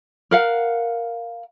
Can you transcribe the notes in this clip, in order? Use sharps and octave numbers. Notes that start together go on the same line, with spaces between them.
A#4 F5 F#5